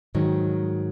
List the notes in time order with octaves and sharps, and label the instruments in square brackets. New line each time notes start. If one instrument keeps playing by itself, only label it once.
[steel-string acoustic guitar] G#2 D#3 F#3